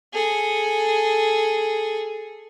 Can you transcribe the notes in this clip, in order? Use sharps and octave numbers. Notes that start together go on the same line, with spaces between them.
G#4 A4